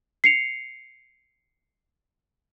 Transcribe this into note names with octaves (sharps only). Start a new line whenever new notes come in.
C7 C#7 F7